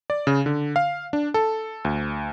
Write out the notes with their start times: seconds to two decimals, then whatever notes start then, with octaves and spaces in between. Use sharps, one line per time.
0.10 D5
0.27 C#3
0.46 D3
0.76 F5
1.13 D4
1.34 A4
1.85 D2